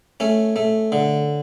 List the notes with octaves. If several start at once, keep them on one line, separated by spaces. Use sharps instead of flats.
A3 C#4
A3
D3